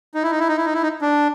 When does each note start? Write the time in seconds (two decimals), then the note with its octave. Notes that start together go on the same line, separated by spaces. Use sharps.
0.14 D#4
0.23 E4
0.31 D#4
0.39 E4
0.48 D#4
0.57 E4
0.65 D#4
0.74 E4
0.83 D#4
1.02 D4